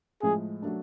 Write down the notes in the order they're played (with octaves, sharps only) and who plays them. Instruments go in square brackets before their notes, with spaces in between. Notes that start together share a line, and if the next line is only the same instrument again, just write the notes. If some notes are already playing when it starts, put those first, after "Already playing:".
[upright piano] A2 F3 G#3 [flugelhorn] G#4
[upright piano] F#3 A3 D4